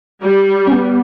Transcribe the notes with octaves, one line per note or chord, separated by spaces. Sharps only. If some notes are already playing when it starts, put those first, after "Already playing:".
G3
C#4
B3